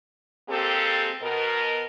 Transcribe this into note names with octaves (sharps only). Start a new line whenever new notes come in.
G#3 A#3 C4 G4 A4
B2 A#4